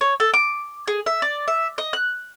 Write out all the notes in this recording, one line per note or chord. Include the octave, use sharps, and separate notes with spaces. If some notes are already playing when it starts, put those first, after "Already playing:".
C#5
A4
D6
G#4
E5
D5
E5
D#5
F#6